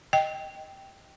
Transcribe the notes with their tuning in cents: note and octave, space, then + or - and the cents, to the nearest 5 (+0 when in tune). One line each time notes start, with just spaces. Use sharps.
D#5 +0 G5 +0